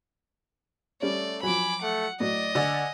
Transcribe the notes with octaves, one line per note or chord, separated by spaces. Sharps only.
G3 A3 C#4 D5
F3 F#3 G#5 B5 D6
A3 F#5
A2 F#3 D5 D#5
D3 D5 G#5